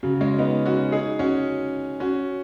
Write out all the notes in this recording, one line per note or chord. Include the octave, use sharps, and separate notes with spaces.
C#3 F#3
G#3 C#4
B3 D#4
C#4 F#4
D#4 G#4
C#4 F#4
C#4 F#4